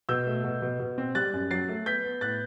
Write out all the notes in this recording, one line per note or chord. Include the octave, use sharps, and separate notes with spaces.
B2 E6 G6
A3
B2
B2
B2
C4
G3 F#6 A6
F#2
F#3 A6 C7
A3
B3 G6 B6
B3
A2 F#6 A6